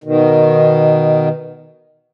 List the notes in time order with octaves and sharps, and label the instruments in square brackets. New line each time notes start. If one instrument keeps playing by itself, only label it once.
[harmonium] B2 D#3